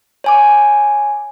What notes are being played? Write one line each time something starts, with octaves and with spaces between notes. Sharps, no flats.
C#5 G#5 D6